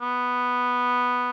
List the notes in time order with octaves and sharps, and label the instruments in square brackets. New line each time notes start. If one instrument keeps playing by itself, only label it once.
[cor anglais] B3